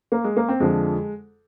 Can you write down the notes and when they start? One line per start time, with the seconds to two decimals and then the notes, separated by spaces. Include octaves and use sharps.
0.12 A#3
0.24 G#3
0.37 A#3
0.48 C4
0.60 F2 D3 F3 G#3